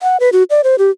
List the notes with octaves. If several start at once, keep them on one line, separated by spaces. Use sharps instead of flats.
F#5
B4
F#4
D5
C5
G4